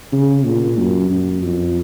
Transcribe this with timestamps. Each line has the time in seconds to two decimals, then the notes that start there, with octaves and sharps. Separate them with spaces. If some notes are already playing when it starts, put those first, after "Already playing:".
0.12 C#3
0.45 A#2
0.78 F#2
1.10 F#2
1.43 F2